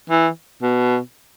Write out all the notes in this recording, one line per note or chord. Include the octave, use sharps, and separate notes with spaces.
E3
B2